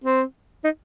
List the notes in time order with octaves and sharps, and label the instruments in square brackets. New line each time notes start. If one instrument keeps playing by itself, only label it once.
[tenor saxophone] C4
D#4